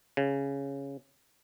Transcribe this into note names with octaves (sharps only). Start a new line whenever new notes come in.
C#3